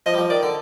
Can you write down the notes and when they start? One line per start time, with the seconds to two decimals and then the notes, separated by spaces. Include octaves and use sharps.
0.06 F3 D#5
0.14 G3
0.18 F3
0.30 D#3 D5
0.43 D3